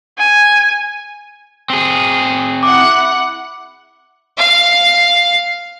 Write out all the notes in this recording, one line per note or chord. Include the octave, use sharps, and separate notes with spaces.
G#5
C4 G#4
E4 F#5 D6
F5